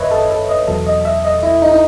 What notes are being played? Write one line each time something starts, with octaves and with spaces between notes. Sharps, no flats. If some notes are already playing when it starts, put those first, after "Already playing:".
Already playing: F#2 D#3 B4 C#5 D#5 E5
A4
A4
D#5
E2 B2 F#3 A4
D#5
E5
D#5
E4
D#4
D#4